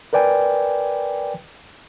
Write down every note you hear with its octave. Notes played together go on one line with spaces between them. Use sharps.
A#4 B4 D5 G5 G#5